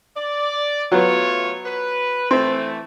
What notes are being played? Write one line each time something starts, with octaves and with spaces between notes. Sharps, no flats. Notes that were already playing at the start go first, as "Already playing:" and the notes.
D5
F#3 A3 B3 F4 C#5
B4
E3 A3 C4